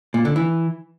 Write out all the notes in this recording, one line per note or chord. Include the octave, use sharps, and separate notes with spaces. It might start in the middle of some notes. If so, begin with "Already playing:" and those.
A#2
D3
E3